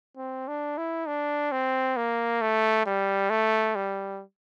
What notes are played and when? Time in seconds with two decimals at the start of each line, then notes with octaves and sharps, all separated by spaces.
0.17 C4
0.48 D4
0.78 E4
1.07 D4
1.52 C4
1.97 A#3
2.41 A3
2.86 G3
3.30 A3
3.75 G3